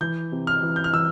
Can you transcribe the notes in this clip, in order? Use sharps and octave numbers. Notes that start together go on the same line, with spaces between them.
E3 G6
C3
F6
E3
G6
F6
E3 E6